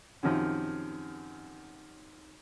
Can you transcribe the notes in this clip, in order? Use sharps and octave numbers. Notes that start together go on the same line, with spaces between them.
F#2 C3 D#3 F3